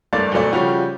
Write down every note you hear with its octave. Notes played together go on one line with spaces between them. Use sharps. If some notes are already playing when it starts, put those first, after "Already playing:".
F#1 G2 A3 A#3 D5 A6
D2 B2 F#3 A3 D5
C#3 F3 G3 C#4 F#4 G4